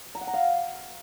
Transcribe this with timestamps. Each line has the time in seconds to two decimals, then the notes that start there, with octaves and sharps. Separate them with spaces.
0.15 A#5
0.21 F#5
0.27 A#5
0.34 F5